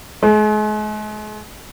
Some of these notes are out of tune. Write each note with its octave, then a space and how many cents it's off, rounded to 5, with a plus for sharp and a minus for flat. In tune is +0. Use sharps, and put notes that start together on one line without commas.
G#3 +40